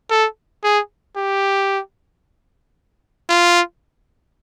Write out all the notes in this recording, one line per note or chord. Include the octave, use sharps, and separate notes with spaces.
A4
G#4
G4
F4